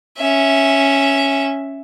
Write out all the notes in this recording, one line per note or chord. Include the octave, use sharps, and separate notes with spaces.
C#4 E5